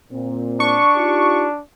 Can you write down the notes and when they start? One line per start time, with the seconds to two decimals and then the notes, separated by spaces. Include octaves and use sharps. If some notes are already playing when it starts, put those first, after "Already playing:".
0.12 A#2 C4
0.60 D4 C#6
0.96 D#4 F4 G4